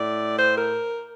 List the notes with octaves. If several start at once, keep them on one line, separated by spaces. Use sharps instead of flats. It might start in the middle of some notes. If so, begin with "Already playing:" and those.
Already playing: A2 D5
C5
A#4